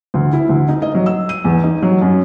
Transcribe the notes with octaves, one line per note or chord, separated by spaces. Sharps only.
D2
E4
D2
D#4
D#5
F#3
E6
D#7
E2
D#4
F#3
F#2